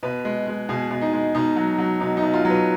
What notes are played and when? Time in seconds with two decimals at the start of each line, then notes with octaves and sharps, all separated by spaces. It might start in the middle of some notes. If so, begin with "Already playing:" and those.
0.03 B2 B4
0.25 G#3
0.47 G#3
0.69 B2 G#4
0.91 B2
1.01 D#4
1.13 G#3
1.35 B2 D#4
1.56 F#3
1.78 F#3
2.00 B2 D#4
2.17 D#4
2.22 B2
2.34 F4
2.45 F#3 B4